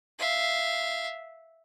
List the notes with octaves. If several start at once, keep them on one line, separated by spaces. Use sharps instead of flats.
E5 F5